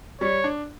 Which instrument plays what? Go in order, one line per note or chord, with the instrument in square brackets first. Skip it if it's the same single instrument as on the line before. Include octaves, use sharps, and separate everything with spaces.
[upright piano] G3 [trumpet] C#5
[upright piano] D4